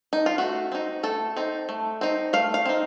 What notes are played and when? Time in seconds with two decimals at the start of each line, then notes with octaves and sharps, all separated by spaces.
0.13 D#4
0.26 F4
0.38 A3 F#4
0.72 C4 D#4
1.03 A3 A4
1.36 C4 D#4
1.69 A3
2.01 C4 D#4
2.33 A3 F5
2.54 F5
2.65 C4 D#4